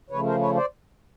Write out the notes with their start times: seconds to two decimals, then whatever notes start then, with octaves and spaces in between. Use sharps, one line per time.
0.10 C#3 F3 A3 B4 C#5
0.25 A#4 C5
0.40 B4 C#5
0.55 C5 D5